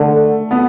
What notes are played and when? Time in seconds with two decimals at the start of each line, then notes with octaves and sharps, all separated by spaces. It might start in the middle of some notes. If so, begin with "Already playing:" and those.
Already playing: D3 A3
0.51 B3